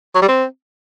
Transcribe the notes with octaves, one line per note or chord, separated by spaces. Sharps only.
F#3
G3
C4